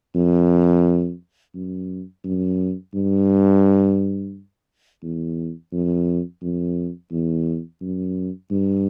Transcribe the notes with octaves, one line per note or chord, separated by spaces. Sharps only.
F2
F#2
F#2
G2
E2
F2
F2
E2
F#2
G2